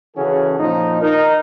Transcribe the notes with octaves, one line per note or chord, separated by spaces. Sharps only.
C#3 E3 C#4 F#4 G#4 A4
A#2 F3 D#4
D#4 A#4